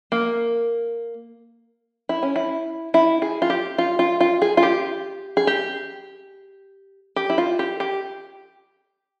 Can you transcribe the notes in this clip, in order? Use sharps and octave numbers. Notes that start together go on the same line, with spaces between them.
A#3
E4
C#4
E4
E4
G#4
F4
G4
F4
F4
F4
G#4
F4
G4
G#4
G4
G4
E4
F4
G4
G4